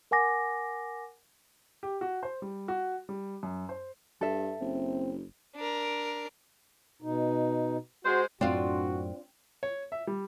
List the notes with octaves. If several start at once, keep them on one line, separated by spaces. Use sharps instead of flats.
A#4 F#5 G#5 D6 A#6
G4
F#4
C5
G3
F#4
G3
F#2
C5
G2 A4 E5
F#1 C4
D4 A#4
B2 D#4
G#3 F#4 C5
F#2 A2 C4 D4 F4 F#4
C#5
E5
G3